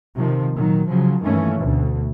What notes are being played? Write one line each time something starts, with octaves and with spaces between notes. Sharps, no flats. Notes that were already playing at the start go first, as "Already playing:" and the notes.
C3 D#3 F3
A#2 D#3 F#3
C#3 F3 F#3
G2 D#3 E3 A3 A#3 C#4
D2 B2